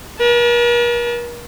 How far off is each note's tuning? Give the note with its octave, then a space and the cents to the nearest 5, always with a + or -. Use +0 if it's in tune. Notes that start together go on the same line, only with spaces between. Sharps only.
A#4 +45 A5 -25